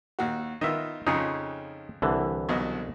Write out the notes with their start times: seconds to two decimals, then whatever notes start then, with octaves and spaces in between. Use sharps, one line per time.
0.19 D#2 F#4
0.61 D#3 B3 F4 D#5 E5
1.07 F2 C#3 F3 D#4 G#4 C#5
2.02 C2 D3 E3
2.49 B1 B2 D#5